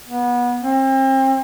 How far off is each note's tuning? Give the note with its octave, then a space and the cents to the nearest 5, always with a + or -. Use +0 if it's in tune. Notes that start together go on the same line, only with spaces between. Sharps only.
B3 -25
C4 +35